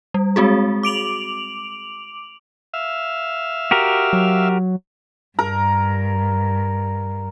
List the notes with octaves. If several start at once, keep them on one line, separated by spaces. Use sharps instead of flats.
G3
G#3 C4 F#4 G#4
D6 D7 F7 F#7
E5 F5
F#4 G4 A#4
F#3
G2 A#4